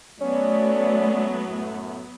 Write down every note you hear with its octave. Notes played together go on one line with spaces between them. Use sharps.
F#3 A3 B3 C#4 D5
F#2 A2